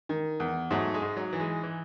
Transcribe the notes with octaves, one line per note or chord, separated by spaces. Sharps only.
D#3
E2
G#2 F#3 A3
G#3
G#2
F#3
E3
G#3
E3